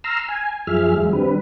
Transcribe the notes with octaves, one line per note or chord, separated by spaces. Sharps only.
A#5 C6 E6 F6
G#5
F#2 F3 G#4 E5 F6
E2 F#3 G#3
D3 G3 C4 B4